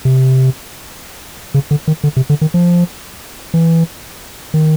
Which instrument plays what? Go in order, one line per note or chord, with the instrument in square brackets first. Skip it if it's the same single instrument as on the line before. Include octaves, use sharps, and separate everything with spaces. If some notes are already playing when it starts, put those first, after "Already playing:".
[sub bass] C3
C#3
D3
D#3
D3
C3
D3
D#3
F3
E3
D#3